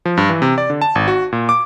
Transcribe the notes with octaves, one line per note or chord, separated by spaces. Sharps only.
F3
G2
E3
C3
D5
D3
A5
G#1
F#4
A#2
D6